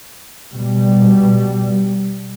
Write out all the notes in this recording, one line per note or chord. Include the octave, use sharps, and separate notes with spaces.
B2 G3